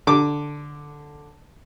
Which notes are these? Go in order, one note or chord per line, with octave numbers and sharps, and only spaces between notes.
D3 D6